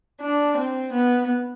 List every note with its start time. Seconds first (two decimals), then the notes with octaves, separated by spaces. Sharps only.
0.21 D4
0.57 C4
0.93 B3